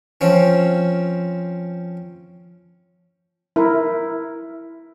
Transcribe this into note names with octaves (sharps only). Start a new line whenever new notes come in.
F3 C4 C#4
E4 A#4